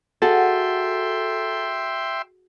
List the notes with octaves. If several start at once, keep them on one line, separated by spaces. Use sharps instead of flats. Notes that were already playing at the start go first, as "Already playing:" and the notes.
F#4 G#4 A4 E5 G5 C6